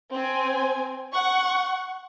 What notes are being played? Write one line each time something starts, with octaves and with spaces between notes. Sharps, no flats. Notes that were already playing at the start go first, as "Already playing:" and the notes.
C4 G#5
F#5 C#6